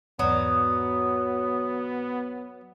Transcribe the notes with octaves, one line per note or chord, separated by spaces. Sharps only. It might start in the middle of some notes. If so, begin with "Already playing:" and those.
E2 G#2 F#3 B3 D#6